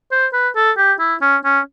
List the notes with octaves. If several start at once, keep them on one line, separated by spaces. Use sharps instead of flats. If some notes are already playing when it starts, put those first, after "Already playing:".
C5
B4
A4
G4
E4
C#4
C#4